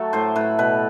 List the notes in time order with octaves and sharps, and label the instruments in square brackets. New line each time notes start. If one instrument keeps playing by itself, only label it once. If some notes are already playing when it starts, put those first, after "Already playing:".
Already playing: [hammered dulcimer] F#3 A3 A4
A2 C5
A2 B4
B2 B4